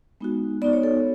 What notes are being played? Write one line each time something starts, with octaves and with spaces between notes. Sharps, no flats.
G#3 B3 D#4 F#4
B3 D#4 F#4 D5
C#5
A4